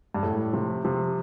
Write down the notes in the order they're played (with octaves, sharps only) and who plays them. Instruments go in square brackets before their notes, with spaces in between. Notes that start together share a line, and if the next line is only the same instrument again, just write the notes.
[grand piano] G2
[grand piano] A2 [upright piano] A3
[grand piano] C3 [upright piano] F3
[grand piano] C3 [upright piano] F3